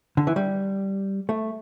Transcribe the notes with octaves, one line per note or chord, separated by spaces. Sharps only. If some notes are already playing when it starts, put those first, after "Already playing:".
D3
E3
G3
A3